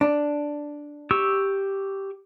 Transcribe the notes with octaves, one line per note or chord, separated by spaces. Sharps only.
D4
G4 C#6 E6